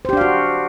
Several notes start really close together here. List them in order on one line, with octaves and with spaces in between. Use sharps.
C5 G4 D4 F5 F#4